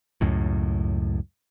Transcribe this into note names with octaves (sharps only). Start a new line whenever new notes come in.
C#2 F#2 A2